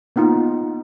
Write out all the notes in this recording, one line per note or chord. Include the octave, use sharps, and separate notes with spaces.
A#3 B3 D#4 F4